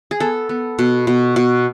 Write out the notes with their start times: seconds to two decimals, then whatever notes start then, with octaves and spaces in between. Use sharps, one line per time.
0.11 G#4
0.20 B3 A4
0.49 B3
0.79 B2
1.07 B2
1.36 B2